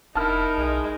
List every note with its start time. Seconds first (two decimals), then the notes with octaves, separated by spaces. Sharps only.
0.15 F1 D#4 E4 A#4 A5 F6
0.57 B1 G#3